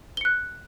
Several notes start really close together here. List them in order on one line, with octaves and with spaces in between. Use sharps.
G7 C#7 F#6